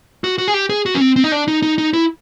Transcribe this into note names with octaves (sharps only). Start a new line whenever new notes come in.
F#4
F#4
G#4
G4
G#4
F#4
C#4
C4
C4
D#4
D4
D#4
D#4
D#4
E4